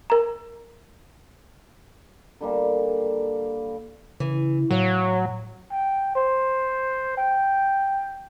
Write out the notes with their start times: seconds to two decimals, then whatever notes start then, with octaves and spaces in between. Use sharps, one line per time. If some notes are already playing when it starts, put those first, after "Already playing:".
0.10 A#4 A#5
2.41 D3 G3 A#3
4.20 C#3 E3
4.71 A2 F#3 C#5 F5
5.72 G5
6.15 C5
7.17 G5